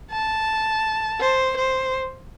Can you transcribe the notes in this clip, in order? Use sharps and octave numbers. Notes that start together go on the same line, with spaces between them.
A5
C5
C5